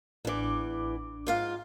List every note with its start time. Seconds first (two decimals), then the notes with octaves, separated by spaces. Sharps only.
0.25 A1 E2 E3 D4 D6
1.27 G#2 F4 F5